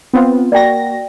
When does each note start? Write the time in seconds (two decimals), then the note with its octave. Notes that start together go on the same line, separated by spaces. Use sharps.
0.13 B3 C4 F4
0.52 A#3 F#4 D5 G5 A#6